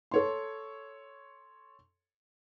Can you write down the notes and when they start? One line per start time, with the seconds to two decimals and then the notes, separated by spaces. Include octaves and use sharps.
0.11 A4 C#5 C6